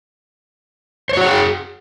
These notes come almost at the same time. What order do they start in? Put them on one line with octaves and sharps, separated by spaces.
C5 C#5 F#4 F#5 G#4